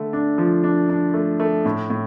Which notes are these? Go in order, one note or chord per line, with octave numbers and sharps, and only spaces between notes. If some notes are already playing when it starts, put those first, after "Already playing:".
Already playing: D3 A3
D4
F3
D4
D4
A3
A3
A2
A2